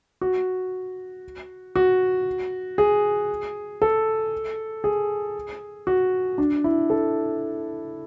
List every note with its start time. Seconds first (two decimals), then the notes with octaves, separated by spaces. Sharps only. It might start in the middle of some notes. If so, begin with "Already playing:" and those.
0.21 F#4
1.76 F#4
2.78 G#4
3.82 A4
4.84 G#4
5.87 F#4
6.38 D4
6.64 E4
6.90 A4